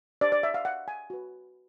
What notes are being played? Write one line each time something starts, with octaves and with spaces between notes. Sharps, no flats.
D4 G4 C5 D5
D5
E5
F5
F#5
G#5
F#4 B4